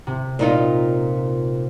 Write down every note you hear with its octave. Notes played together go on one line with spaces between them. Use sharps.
C3
A#2 D#4 F4